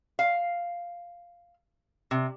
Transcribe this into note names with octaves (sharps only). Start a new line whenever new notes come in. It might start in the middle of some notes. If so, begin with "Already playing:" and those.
F5
C3